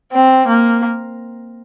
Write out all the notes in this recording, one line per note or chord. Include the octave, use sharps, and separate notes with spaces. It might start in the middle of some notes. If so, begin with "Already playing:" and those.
C4
A#3